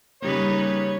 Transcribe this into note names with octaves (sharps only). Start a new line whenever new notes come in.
C#3 G3 A#3 D#4 B4 C#5